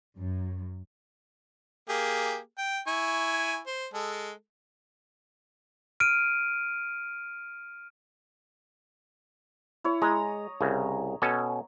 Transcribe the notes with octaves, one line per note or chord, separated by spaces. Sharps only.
F#2
A#3 G4 G#4
G5
E4 G#5 C#6
C5
G#3 A4
F6 D7 D#7
E4 C#5
G#3 A#5 D#6
C2 C#3
B2 C#4 A4